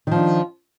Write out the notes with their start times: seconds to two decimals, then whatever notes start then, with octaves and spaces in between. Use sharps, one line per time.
0.07 D#3
0.11 F3
0.16 D4